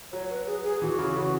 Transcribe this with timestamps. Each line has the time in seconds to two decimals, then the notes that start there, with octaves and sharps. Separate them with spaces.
0.12 F#3 C#5
0.29 B4
0.46 G#4
0.64 G#4
0.81 E3 F#4
0.99 C#3
1.17 C#3